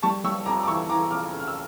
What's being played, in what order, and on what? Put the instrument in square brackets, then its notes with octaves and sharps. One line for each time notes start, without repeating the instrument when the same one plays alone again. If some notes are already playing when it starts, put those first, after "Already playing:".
[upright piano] G3 A5 C#6
G3 C#6 E6
F2 A#5 D6
D6
E3 C#6 E6
E3 A#5 D6
F2 D6 F6
C#3
F6
E6